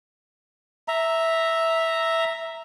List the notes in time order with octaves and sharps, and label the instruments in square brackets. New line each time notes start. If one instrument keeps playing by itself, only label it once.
[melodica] E5 A#5